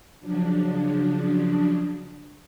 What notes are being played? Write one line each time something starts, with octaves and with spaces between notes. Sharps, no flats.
C#3 F3 F#3 D4